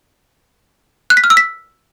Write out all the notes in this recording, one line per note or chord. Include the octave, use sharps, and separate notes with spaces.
F#6
B6
F6
E6
B6